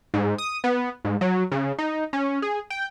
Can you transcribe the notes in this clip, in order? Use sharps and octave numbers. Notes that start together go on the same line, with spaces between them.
G#2
D#6
B3
G#2
F#3
C#3
D#4
C#4
G#4
G5